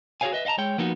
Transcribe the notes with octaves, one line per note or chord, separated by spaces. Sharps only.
F#4 G#4 A4 C#5 F5 G#5
B4 D#5 E5
D#5 F5 F#5 A5 A#5
G#3 C#5 G5
F3 A#3 B3 D#4 F#4